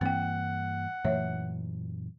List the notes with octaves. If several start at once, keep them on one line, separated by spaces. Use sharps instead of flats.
G2 E3 A#3 C4 F#5 G5
F#2 A#2 E3 A3 C#5 E5